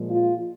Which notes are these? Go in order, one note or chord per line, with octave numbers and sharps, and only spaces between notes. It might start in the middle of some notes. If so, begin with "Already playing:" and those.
Already playing: A#2 F3 G#3
F4